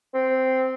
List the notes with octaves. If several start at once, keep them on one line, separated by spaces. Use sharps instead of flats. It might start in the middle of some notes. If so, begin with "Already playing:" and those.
C4